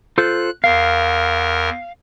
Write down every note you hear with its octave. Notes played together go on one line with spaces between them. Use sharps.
F4 A4 C5 F#6
E2 A#4 F5